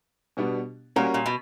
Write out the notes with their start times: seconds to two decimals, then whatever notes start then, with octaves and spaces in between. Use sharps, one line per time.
0.37 B2 G3 B3 D4
0.96 A#2 G3 A#3 C#4 F#4 A#4
1.14 A#2
1.26 B2